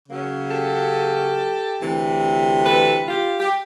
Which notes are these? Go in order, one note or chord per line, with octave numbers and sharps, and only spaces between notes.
C#3 F#3 A#3 C#4
G4 A4
D2 C3 E3
A4 B4
F4 G4
G4